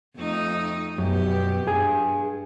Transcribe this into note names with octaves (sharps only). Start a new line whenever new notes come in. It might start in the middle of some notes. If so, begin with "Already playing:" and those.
F2 A3 D#4
F#2 B2 B3 G4
G2 G#4